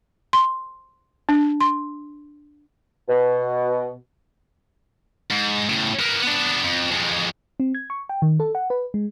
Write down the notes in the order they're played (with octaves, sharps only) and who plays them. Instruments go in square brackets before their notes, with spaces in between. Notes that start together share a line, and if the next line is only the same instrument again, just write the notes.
[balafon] C6
D4
C6
[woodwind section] B2
[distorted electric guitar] G#2
A2 C#3
A#3 B3
B3 D4
F2
F2 G#3
[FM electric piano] C4
G#6
C#6
G5
D#3
A4
F#5
B4
G#3